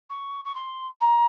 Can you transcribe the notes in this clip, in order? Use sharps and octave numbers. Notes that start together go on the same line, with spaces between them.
C#6
C#6
C6
A#5